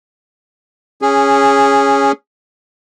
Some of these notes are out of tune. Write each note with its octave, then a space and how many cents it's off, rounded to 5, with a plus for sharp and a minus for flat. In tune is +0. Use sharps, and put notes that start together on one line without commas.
C#4 +0 G#4 -10